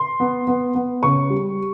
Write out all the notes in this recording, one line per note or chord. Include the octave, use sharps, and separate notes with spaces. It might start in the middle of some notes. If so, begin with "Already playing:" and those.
Already playing: C6
B3
B3
B3
C#3 C#6
G3